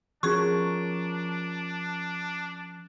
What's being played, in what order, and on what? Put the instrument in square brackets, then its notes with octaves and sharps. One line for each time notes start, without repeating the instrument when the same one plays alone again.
[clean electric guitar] F3 C#4 A#4 [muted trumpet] D4 [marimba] F#4 G#4 [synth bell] C#6